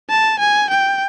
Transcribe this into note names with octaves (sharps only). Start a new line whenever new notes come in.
A5
G#5
G5